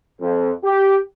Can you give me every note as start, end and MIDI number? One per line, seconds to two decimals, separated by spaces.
0.20 0.51 41
0.64 0.97 67